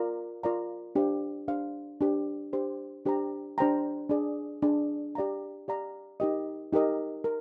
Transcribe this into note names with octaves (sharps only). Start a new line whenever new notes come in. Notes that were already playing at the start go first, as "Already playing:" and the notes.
Already playing: F4 A#4 D5 F5 A#5
F4 A#4 D5 F5 A#5
D4 G4 C5 F5
D4 G4 C5 F5
D4 G4 C5
D4 G4 C5
D4 G4 C5 G5 A#5
D4 G4 C5 G5 A#5
D4 G#4 D5
D4 G#4 D5
G4 D5 F5 A#5
G4 D5 F5 A#5
D#4 G4 A#4 D#5
D#4 G4 A#4 D#5
A#4